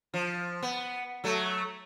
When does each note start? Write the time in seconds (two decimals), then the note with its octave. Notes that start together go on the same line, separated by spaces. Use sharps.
0.14 F3
0.62 B3
1.24 F#3 A3